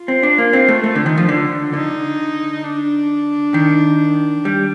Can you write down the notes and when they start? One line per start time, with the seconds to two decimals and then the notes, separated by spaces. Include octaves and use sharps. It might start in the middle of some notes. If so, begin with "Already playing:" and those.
Already playing: F4
0.08 C4
0.23 D4
0.38 A#3
0.53 C4
0.68 A3
0.84 A3
0.95 D3
1.06 D#3
1.17 F3
1.29 D3
1.73 D3 D#4
2.64 D4
3.54 D#3
4.45 G3